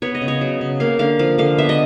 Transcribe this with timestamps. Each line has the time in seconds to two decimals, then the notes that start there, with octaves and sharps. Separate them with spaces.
0.02 B3 C#5
0.15 D#5
0.22 C#3
0.28 C#5
0.41 F#3
0.61 C#3
0.80 A#3 F5
0.99 D3 F5
1.19 F3 F5
1.38 D3 F5
1.58 B3 E5
1.69 D#5